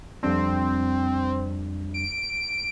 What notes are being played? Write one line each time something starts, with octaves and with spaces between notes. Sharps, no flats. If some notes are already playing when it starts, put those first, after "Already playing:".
F2 G3 C4 D4
D7